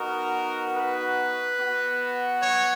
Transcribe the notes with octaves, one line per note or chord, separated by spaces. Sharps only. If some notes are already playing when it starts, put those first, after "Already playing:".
Already playing: B3 D#4 F#4 A#4
B4
B3 F#4
C#5